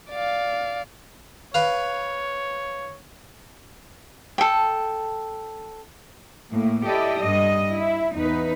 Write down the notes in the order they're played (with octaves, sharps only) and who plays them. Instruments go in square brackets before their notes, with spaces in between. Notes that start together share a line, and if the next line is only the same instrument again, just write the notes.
[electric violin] D5 F5
[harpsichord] B4 F5 [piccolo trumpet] C#5
[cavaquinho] A4 G5
[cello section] A2 A#3
E4 G4 A4 D5 D#5
G2 D#5
E4
E2 D#4 B4